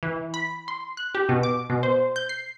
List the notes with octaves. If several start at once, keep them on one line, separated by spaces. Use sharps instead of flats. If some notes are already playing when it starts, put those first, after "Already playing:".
E3
B5
C6
F#6
G4
B2
D6
B2
C5
G6
C7